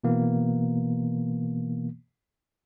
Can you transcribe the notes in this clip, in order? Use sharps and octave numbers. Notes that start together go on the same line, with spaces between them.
B2 E3 A#3 B3